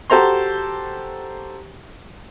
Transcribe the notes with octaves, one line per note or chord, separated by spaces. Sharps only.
F#4 G4 A4 C5 A#5 C6